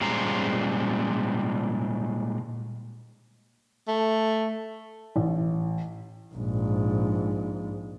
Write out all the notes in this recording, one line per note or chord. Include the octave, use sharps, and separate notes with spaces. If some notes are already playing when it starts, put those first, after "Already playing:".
A#2 G3 G#3 C#4 C5 A#5
A3
A1
A#1 G#2